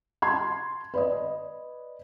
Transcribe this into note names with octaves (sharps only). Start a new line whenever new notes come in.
A5 C6 G#6
B4 D5 D#5